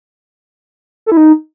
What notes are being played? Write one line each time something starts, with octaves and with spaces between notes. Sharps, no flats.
A4
E4
D#4